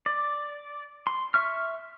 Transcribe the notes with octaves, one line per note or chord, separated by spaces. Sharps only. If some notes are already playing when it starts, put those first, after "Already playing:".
D5
C6
E5 C#6 F6